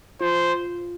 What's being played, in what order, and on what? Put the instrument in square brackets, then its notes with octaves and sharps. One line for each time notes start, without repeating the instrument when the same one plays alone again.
[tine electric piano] F4 [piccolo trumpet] C5